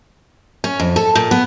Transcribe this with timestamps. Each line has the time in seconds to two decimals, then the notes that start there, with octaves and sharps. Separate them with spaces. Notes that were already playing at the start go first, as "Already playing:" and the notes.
0.64 C#4
0.80 F2
0.96 A4
1.15 A#2
1.31 B3